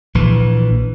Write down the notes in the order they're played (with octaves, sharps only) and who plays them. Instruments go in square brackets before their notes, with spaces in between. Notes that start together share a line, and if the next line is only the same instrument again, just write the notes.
[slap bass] A#1 E3